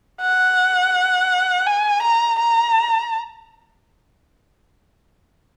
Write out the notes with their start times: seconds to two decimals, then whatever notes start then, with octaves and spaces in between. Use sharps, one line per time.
0.21 F#5
1.67 G#5
2.03 A#5
2.39 A#5